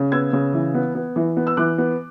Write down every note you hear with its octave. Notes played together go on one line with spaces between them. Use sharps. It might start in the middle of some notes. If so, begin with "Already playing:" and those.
Already playing: C#3
B3 E6 G#6
C#3
E3
B3
B3
E3
B3
E6
E3 D6 F#6
B3